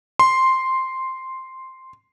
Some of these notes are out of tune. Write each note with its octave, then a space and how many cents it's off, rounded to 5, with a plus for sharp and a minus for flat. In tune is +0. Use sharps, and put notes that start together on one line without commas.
C6 +0